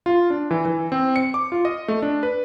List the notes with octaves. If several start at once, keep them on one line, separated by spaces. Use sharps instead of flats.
F4
D4
E3
E3
C4
C#7
D6
F4
D#5
A3
D4
B4